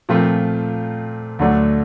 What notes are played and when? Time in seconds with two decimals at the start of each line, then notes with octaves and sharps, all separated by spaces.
0.09 A#2 F3 A3 C4 F4
1.39 D2 D3 F#3 A3 D4